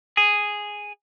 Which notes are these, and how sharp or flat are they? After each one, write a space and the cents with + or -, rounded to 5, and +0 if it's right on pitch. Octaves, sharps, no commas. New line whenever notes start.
G#4 -5